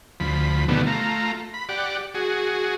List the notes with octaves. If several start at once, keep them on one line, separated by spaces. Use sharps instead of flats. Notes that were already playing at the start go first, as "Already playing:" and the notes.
D2 F3 B5
B2 D3 D#3 G3 A3 B3
A3 F4 A#5
B5
G4 D5 F#5
F#4 G#4